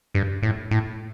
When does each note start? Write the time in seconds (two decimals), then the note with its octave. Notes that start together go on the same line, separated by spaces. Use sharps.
0.15 G2
0.43 A2
0.71 A2